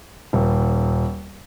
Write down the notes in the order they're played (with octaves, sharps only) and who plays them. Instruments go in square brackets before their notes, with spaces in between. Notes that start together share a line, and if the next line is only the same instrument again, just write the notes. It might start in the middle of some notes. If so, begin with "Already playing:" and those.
[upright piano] D#1